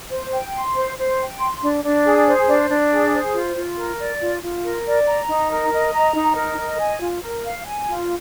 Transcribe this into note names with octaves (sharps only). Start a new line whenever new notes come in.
C5
G5
C6
C5
C5
G5
C6
D4
D4
G#4
C5
D4
D4
G#4
C5
F4
F4
A#4
D5
F4
F4
A#4
D5
A#5
D#4
A#4
D#5
A#5
D#4
A#4
D#5
G#5
F4
A#4
F5
G#5
F4